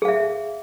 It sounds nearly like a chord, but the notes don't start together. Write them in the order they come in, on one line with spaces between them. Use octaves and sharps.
G#4 F5 E5